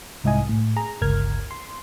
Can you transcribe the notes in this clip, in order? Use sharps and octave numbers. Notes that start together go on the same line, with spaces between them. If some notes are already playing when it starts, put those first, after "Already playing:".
C2 G#2 E4 D#5 G#5
A2
G#4 A#5
G1 C#2 A#4 F6 G#6
C6